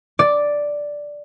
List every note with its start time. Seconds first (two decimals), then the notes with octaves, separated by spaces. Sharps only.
0.19 D5